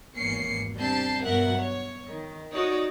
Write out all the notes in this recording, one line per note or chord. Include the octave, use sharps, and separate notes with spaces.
G#1 E2 A#3 C#4 C7 C#7
C3 G3 D4 A5 G6 C7
G2 B2 F#3 A#4 E5 F#5
C#5
D#3
D#4 F#4 C#5 D5